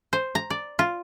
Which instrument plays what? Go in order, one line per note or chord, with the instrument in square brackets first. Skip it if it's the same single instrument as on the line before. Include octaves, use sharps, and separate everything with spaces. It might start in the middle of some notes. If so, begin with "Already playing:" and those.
[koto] C5
A#5
D5
F4